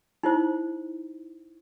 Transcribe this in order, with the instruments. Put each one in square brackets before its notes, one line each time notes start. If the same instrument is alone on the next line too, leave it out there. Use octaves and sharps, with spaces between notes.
[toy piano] D#4 E4 C5